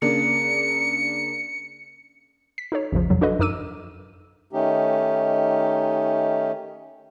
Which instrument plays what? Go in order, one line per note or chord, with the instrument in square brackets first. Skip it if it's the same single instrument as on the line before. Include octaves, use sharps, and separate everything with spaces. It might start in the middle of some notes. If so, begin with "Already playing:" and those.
[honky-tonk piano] C#3 A#3 D4 [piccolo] C#7
[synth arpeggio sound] B6
D#4 A4 C#5
A1 E2 C#3 F3
F2 C3 F3 F#3
D4 F#4 A4 B4 D#5
F#2 D#4 A#4 D6 E6 D#7
[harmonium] D#3 A3 C#4 D#4 G4